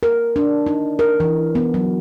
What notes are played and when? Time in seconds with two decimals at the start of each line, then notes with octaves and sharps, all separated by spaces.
0.03 A#4
0.36 D4
0.66 D#4
0.99 A#4
1.20 E3
1.55 B3
1.74 F#3